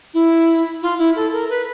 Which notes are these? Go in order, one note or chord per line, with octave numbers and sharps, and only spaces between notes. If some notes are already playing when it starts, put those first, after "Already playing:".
E4
F4
E4
A4
A#4
B4